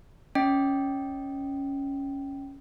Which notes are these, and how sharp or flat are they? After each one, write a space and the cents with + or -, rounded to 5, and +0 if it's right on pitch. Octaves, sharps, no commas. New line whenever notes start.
C#4 +0 D#5 +0 G5 -15